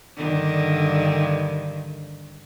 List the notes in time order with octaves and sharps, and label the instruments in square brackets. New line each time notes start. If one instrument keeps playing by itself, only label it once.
[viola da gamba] G2 D3 D#3